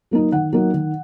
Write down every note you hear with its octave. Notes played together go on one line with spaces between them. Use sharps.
F#3 A#3 D#4
D#3 F#5
F#3 A#3 D#4
D#3